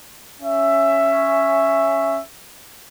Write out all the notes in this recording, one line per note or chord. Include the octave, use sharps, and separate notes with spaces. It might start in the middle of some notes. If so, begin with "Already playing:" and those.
C#4 E5